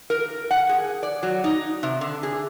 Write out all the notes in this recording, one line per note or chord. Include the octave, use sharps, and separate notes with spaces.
A#4
F#5
G#4
D5
F#3
D#4
C3
D3
G#4